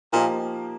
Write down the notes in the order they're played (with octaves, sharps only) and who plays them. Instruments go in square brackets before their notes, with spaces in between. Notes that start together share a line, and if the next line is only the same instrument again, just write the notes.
[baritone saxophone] A#2 [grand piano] F3 A#3 D#4 G4